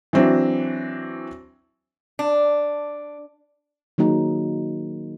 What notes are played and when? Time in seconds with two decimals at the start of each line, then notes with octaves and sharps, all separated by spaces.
0.13 E3 F#3 C4 D4
2.19 D4
3.98 D#3 F#3 A#3 D#4 G#4